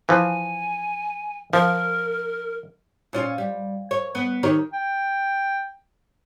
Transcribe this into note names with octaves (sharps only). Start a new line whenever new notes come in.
E3 F3 G#5
F3 A#4
A#2 C#4 F4
G3
C#5
B3
D#3 G4 C#5
G5